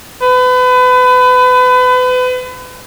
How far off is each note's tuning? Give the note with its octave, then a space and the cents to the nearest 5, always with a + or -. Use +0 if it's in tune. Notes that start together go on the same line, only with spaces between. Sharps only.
B4 +30